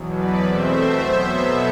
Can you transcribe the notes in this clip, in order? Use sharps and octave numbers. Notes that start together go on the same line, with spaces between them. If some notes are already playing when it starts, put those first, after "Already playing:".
Already playing: E2 B2 F#3
B4 D5
E2 B2 A3 C4 C5 E5
B2 F#3 B3
A4 C5